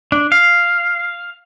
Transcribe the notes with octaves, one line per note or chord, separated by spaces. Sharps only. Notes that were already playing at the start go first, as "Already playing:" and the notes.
D4
F5